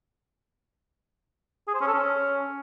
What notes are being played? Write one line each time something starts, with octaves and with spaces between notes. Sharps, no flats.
G#4
C5
C#4
A4
C#4